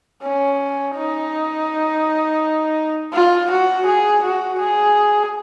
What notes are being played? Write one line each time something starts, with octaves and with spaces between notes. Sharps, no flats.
C#4
D#4
F4
F#4
G#4
F#4
G#4